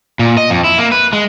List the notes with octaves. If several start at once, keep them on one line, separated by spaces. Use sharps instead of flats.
A#2
D#5
F2
E4
A#3
B4
G#3